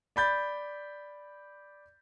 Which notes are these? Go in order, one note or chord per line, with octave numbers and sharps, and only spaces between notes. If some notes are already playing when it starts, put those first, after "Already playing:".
D5 B5 G6 A6